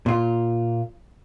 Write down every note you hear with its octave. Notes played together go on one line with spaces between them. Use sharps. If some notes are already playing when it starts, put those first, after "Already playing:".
A#2 F4